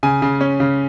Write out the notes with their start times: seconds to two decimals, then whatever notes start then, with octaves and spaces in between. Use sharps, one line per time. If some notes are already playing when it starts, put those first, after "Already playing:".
0.03 C#3 G#5
0.22 C#3
0.41 C#4
0.60 C#3